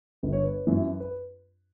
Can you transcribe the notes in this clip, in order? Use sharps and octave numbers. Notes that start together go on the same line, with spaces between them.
G1 B4
C#5
B4
F#2 E3
B4